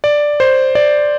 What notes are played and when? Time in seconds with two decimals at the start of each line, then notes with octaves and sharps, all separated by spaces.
0.04 D5
0.40 C5
0.75 D5